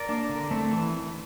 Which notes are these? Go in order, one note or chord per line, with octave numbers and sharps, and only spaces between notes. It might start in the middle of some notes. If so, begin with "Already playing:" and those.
Already playing: A#4 D5
A#3 D4
D3
A3 C4
E3